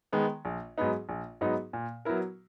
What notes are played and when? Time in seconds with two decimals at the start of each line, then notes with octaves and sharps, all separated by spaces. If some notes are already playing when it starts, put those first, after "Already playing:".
0.12 D#3 G#3 B3
0.45 A#1
0.78 G#2 F#3 B3 D#4
1.09 A#1
1.41 G#2 F#3 B3 D#4
1.73 A#2
2.05 F#3 B3 E4 A#4